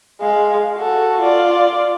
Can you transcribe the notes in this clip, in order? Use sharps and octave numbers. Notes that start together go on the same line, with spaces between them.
G#3 F5
F#4 A4
F4 D5